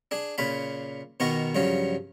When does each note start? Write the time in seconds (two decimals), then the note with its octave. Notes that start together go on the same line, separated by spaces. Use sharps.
0.11 D4 G#4
0.38 A#2 C#3 F4 B5
1.20 B2 D#3 B3 F4 A#4 C#6
1.55 G2 C#3 F3 F#3 C#4